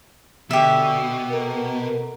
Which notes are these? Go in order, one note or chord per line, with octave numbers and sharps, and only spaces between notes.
B2 D3 G4 E5
B3 A4 A#4